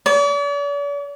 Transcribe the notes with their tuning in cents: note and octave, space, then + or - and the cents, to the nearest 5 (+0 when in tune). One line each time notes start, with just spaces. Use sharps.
D5 -45